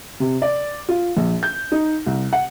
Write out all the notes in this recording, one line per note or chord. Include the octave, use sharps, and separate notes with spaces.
C3
D5
F4
A#1
G6
D#4
C2
F#5